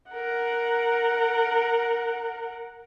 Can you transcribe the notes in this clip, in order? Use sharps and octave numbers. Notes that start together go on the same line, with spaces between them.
A#4 F#5